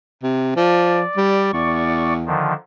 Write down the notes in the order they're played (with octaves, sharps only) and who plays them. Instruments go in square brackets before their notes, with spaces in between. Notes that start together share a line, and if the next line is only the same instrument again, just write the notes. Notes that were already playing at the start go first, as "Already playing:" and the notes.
[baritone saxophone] C3
[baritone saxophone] F3 [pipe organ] D5
[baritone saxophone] G3
[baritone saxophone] E2 [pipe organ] D5 C#6
[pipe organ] D3 D#3 F3